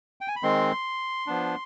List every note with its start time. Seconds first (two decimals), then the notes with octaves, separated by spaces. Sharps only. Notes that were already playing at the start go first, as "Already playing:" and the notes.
0.21 G5
0.28 G#5
0.36 B5
0.43 D#3 G#3 C4 C6
1.27 F3 B3 D4